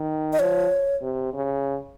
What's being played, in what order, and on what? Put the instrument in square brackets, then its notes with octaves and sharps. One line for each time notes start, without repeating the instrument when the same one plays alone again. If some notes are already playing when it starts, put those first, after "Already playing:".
Already playing: [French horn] D#3
[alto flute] D#5
[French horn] F3 [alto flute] C#5
[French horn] C3
C#3